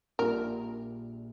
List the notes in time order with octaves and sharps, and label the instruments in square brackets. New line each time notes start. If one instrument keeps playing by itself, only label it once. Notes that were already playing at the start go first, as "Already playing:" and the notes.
[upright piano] A#1 A#2 G3 D4 F4 [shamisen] A#4